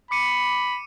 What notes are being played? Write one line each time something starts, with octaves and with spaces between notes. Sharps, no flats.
B5 D6 C#7 D#7